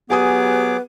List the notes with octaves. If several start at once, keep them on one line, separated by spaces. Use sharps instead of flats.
F#3 B3 G4 G#4 B4 G#5 D6 D#6